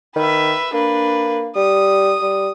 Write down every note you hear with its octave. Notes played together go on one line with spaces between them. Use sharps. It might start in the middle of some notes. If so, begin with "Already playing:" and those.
D#3 B4 E5
A#3 D4 B4
G3 D#6
G3